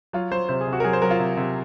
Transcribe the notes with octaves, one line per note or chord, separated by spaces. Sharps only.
F#3 F4
F#3 C5
C3 C5
G#4
C3
F#4
A#4
F#3 G#4
C5
F#3 A#4
F4
C3
C3